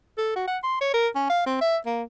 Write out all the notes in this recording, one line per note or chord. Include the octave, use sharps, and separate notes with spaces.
A4
F#4
F#5
C6
C#5
A#4
C#4
F5
C4
E5
A#3